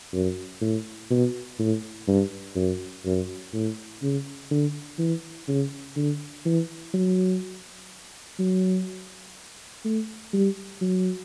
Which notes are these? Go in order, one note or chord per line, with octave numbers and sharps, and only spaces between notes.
F#2
A2
B2
A2
G2
F#2
F#2
A2
C#3
D3
E3
C#3
D3
E3
F#3
F#3
A3
G3
F#3